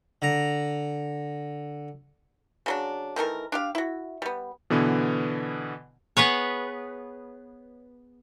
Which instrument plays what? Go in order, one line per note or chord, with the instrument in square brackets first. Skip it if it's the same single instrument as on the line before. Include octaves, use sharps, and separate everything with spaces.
[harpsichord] D3 A#5
[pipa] C#3 F#3 D4
D#3 E3 A3 A#4
D4 G4 F5
E4 F#4
G3 B3
[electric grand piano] B2 D3 E3 B3
[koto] B3 G#4 B4 C#5